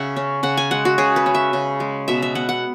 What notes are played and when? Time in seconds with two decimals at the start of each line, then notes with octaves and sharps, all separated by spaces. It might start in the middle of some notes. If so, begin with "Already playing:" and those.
Already playing: C#3 E5 F#5
0.16 C#4
0.43 C#3 F#5
0.57 G#5
0.71 G#3 F#5
0.85 F#4
0.98 C#3 G#4
1.16 B4
1.26 C#4
1.35 E5
1.53 C#3
1.80 G#3
2.08 B2 E5
2.22 E5
2.35 B3 F#5
2.49 F#5